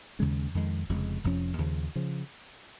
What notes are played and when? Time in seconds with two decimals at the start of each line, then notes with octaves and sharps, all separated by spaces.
0.19 D#2 C#3 G#3 C#4
0.55 F2 D#3 G#3
0.89 F1 F2 C#3 G#3
1.24 F1 F2 F3 C#4
1.58 D#2 C#3 F3
1.96 C#3 F3